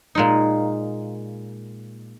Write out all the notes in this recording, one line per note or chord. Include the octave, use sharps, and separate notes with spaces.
A#2 G#3 D#4